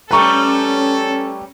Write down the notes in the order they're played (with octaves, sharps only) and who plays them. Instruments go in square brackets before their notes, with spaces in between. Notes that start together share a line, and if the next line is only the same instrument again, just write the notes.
[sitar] G3 A3 B4 [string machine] C#4 [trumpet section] A4 [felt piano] A#5 C#6